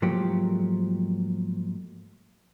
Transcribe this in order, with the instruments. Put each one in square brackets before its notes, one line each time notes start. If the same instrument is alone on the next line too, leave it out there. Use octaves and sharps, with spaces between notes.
[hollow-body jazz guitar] G#2 F3 F#3 A3 A#3 G4